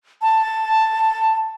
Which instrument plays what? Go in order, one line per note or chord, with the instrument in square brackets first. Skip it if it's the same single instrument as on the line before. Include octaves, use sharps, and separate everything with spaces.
[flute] A5